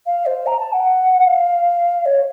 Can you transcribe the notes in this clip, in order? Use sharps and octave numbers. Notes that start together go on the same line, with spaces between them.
F5
C5
A#5
A5
F#5
F5
C#5